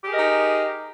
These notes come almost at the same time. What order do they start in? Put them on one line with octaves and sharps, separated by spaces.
G4 G#4 A#4 D#5 D#4